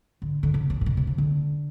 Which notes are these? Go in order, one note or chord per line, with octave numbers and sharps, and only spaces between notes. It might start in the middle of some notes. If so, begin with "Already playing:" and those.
D3
D3
C#3
C#3
C3
B2
C3
C#3
D3